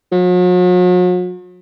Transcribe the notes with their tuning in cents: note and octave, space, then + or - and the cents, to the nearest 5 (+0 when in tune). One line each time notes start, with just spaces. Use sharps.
F#3 -45